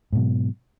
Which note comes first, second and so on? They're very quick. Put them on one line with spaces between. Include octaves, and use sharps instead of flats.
G#2 B2 F#3